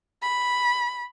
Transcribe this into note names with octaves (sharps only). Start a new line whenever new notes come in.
B5